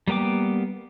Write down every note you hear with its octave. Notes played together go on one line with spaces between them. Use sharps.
G3 A#3 B3 G5 D6